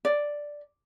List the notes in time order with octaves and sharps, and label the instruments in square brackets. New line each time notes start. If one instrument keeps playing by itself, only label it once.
[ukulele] D5